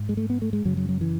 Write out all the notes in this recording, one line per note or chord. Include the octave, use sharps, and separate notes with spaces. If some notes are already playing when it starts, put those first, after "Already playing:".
Already playing: G#2
G#3
A3
B3
A3
G#3
F#2 C#3 F#3
F#3
F#3
E3